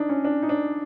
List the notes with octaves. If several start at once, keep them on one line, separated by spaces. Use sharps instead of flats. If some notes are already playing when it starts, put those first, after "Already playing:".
Already playing: D4 D#4
C#4
D4
D#4
D4